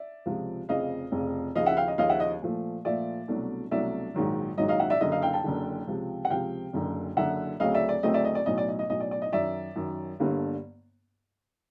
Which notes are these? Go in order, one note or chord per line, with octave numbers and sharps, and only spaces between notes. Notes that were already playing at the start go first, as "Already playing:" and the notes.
Already playing: D5 E5
C#2 C3 F3
F1 F2 C#3 D#5 F5
F1 F2 C#3
D#2 C#3 F3 D#5 F5
E5 F#5
F5 G5
D#5
D#2 C#3 F3 D#5 F5
E5 F#5
D#5
A#2 F3 A3
A#2 F3 A3 D5 E5
C2 B2 F#3 A3 D4
C2 B2 F#3 A3 D4 D5 E5
A#1 G#2 D#3 F#3
A#1 G#2 D#3 F#3 D#5
D#5 F5
E5 F#5
D5 E5
F#1 F#2 D3 D#5
D#5 F5
F5 G5
G5 A5
F#1 F#2 D3
C#2 C3 F3
F#5
C#2 C3 F3 F5 G5
F#1 F#2 D3
F#1 F#2 D3 E5 F#5
D2 C#3 F#3 A3 C4 D#5 F5
D5 E5
D5
D2 C#3 F#3 A3 C4 D#5
D5 E5
D#5
D5
B1 A2 F#3 D#5
D5
D#5
D#5
B1 A2 F#3 D#5
D5
D5
D#5
F#2 D#3 F#3 D5 E5
F#2 D#3 F#3
G1 G2 D3 G3 A#3